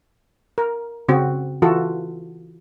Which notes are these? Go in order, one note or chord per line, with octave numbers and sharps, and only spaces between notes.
A#4
C#3 C4 F#4
E3 F4 F#4 A4